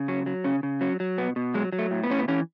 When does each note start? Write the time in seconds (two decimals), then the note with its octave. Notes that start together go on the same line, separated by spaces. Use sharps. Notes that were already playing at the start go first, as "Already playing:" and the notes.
Already playing: C#3
0.08 F#3 C#4
0.26 F#3
0.44 C#3 C#4
0.63 C#3
0.81 F#3 C#4
1.00 F#3
1.18 B2 B3
1.36 B2
1.54 F#3 G#3
1.73 F#3
1.78 A3
1.91 A2
2.04 B3
2.10 A2 C#4
2.19 B3
2.28 E3 C#4